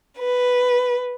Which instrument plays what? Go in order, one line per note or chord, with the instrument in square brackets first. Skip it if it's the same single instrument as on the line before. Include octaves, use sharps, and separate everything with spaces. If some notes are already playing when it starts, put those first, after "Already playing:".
[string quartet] B4